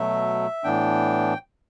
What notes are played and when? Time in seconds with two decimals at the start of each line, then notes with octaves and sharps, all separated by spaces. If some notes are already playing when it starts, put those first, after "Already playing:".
Already playing: B2 F#3 A3 E5
0.64 A2 E3 B3 D4 G5